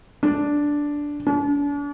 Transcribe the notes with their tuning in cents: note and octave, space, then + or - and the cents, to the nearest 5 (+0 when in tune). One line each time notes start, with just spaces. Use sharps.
D4 -5
D4 -40